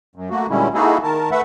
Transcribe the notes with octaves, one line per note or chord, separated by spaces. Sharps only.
F#2
A3 A#3 F#4
A#2 D3 G3 G#3 C#4 E4
A#3 D#4 E4 F#4 G#4 A4
D#3 A#4 A5
A3 B4 E5 F#5